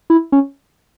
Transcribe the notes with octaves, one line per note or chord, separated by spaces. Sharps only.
E4
C#4